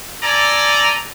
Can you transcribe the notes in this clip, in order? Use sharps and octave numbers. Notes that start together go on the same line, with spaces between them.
A4 D5 G#5 A#5